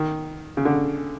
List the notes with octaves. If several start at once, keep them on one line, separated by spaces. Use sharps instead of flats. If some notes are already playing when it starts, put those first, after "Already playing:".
Already playing: D#3
C#3
D3